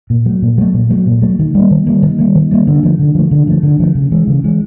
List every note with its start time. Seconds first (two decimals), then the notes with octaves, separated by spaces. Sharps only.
0.10 A#2
0.26 F#3 A3
0.42 A#2
0.58 F#3 A3
0.74 A#2
0.90 F#3 A3
1.06 A#2
1.22 F#3 A3
1.39 D#3
1.55 G3 A#3
1.71 D#3
1.87 G3 A#3
2.03 D#3
2.19 G3 A#3
2.35 D#3
2.51 G3 A#3
2.67 D3
2.83 F3 A3
2.99 D3
3.15 F3 A3
3.31 D3
3.47 F3 A3
3.63 D3
3.80 F3 A3
3.95 C#3
4.12 E3 G#3
4.27 C#3
4.44 E3 G#3